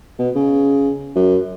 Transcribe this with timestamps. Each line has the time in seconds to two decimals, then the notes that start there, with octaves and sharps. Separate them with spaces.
0.19 B2
0.35 C#3
1.16 F#2